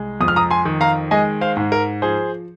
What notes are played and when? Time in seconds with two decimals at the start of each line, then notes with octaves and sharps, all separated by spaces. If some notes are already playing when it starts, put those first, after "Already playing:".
Already playing: C2 G#3
0.21 F2 D#6
0.28 F6
0.36 A#5 D#6
0.51 G#5 C6
0.65 D#3
0.81 F5 A#5
1.11 G#3 D#5 G#5
1.41 C5 F5
1.57 G#2
1.72 A#4
2.02 F3 G#4 C5